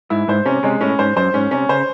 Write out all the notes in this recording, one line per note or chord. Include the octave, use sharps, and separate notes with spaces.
G#2 E4
G#2 C5
C3 C#4
C3 G#3
A2 C#4
G#2 C5
F#2 C5
G#2 C#4
C3 C#4
C#3 C5